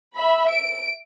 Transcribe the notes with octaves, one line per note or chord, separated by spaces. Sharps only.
E5 B5
D7